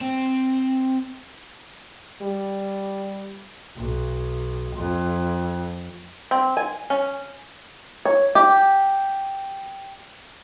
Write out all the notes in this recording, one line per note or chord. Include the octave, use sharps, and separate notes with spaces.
C4
G3
B1
F2
C4
G#5
C#4
C#5
G4